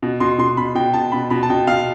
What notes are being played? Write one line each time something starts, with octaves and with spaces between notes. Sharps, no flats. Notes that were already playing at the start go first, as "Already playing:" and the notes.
B2
B2 C6
B2 C6
B2 B5
B2 G5
B2 A5
B2 B5
B2 B5
A5
B2 G5
B2 F5